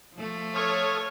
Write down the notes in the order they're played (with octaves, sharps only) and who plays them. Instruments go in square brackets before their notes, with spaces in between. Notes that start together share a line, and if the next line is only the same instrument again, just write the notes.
[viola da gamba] F3 A3
[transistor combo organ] A4 D#6 F6 [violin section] C#5